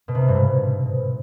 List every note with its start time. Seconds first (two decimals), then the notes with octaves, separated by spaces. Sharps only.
0.08 B2
0.15 C3
0.21 B2
0.28 G2
0.35 G#2